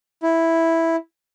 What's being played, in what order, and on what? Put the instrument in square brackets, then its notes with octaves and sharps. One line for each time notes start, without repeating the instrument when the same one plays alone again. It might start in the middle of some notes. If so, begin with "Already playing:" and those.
[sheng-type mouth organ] E4